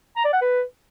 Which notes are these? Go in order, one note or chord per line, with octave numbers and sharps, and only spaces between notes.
A#5
D5
F#5
B4